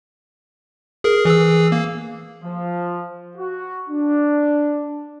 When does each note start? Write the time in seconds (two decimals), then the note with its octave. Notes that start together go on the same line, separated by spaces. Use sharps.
1.04 G#4 A#4
1.25 E3 G#4 E6
1.72 A#3
2.43 F3
3.36 F#4
3.89 D4